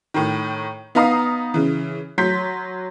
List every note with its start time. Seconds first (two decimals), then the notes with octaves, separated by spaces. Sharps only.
0.14 A2 D#3
0.95 B3 D#4 F5 A#5 D#6 C7
1.54 C#3 E3
2.18 F#3 C6 G6 B6